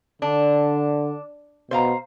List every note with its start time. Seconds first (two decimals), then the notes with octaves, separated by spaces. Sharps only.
0.22 D3 D4
1.71 B2 C5 F5 A#5